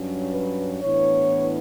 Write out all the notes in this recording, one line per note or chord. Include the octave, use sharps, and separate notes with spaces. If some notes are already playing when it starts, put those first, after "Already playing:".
Already playing: G2 F#3 C#4
B4
A2 E3 B3 D4 C#5